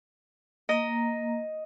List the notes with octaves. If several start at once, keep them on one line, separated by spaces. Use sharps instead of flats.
A#3 D#5 A#5